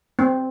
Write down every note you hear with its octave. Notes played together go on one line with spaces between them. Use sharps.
C4